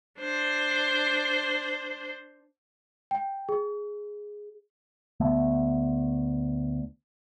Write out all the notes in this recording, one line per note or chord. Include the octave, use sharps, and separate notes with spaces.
D4 C5
G5
G#4
D2 A3 B3